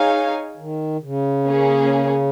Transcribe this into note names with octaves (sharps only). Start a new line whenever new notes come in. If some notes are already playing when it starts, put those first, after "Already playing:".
Already playing: D#4 G#4 C#5 F5 G#5
D#3
C#3
A#3 C#4 G#4